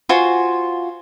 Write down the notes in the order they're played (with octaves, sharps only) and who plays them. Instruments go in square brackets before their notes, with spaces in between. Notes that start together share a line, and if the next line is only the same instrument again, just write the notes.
[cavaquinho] F4 F#4 C5 G#5